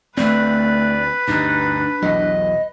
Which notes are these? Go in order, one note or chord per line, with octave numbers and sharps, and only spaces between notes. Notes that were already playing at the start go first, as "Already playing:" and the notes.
D2 A3 C4 B4 D5
D2 G2 D4 D#4
B1 E2 F#3 D#5